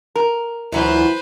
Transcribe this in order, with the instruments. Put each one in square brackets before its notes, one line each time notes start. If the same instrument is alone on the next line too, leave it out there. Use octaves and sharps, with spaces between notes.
[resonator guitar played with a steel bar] A#4
[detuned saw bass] D2 [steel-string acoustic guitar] E3 F#3 F4 [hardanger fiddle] B4 C5